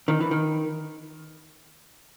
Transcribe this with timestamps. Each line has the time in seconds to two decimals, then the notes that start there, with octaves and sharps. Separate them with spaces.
0.08 D#3
0.21 E3
0.31 D#3